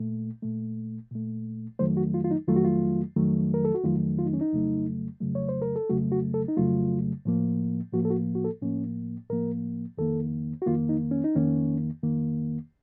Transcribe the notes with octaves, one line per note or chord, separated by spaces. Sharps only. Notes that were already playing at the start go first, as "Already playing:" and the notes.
Already playing: A#2 A3
A#2 A3
A#2 A3
F2 D#3 F#3 A3 C5
F#4
F4
F4
D#4
F2 D#3 F#3 A3 F4
F#4
F4
F2 D#3 F#3 A3
A#4
A4
F#4
F2 D#3 F#3 A3 F4
F4
D#4
C#4
D#4
F2 C#3 F#3 A3
F2 C#3 F#3 A3
C#5
C5
A#4
A4
F2 C#3 F#3 A3 F#4
F#4
A4
D#4
F2 C#3 F#3 A3 F4
A2 F3 A#3
A2 F3 A#3 F#4
A4
F#4
F#4
A4
A2 F3 A#3 C#4
A2 F3 A#3 A#4
F2 D#3 A#3 A4
F#4
F2 D#3 A#3 F4
D#4
C#4
D#4
F2 D#3 A#3 C#4
F2 D#3 A#3